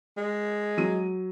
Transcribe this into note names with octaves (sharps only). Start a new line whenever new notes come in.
G#3
F#3 D#7